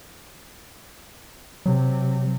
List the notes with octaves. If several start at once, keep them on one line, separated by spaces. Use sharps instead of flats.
C3 F#3